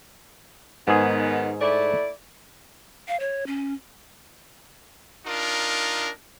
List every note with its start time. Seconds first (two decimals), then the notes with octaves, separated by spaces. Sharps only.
0.88 G#2 D#3 B3 G#4
1.61 A3 E4 D5
3.08 F5
3.20 C#5
3.47 C#4
5.26 D4 D#4 F4 A#4